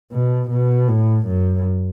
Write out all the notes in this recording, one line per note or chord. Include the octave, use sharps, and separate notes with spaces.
B2
B2
A2
F#2